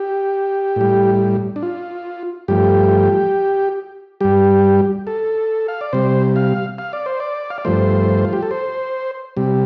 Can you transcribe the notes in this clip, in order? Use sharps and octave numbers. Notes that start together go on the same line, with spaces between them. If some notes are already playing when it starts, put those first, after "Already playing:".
Already playing: G4
A2 G3
D4
F4
G2 F3 A3 G4
G2 G3 G4
A4
F5
D5
C3 G3 C5
F5
F5
D5
C5
D5
F5
D5
G2 F3 A3 C5
F4
G4
A4
C5
C3 G3